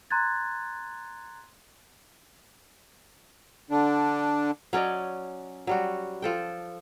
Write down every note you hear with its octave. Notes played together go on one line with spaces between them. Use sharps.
A#5 C6 F#6 G#6 A6
D3 D4
F#3 C#4 D5 D#5
F#3 G3 F#4
F3 A4 G5